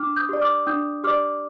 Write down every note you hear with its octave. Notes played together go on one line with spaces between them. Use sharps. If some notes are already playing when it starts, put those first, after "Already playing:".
Already playing: D4 D6 F6
D#6 G6
G4 D5
D6 F6
D4 D#6 G6
G4 D5 D6 F6